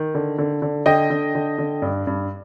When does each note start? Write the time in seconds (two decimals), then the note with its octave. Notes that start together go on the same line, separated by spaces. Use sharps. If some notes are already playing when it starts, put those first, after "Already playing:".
Already playing: D#3
0.15 D3
0.38 D3
0.62 D3
0.86 D3 D#5 G5
1.10 D3
1.35 D3
1.58 D3
1.82 G2
2.07 G2